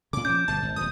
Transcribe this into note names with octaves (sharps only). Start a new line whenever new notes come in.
A#2 C#3 D6
F3 C#4 G6
G1 B2 A5
G#1
D#1 F2 D#6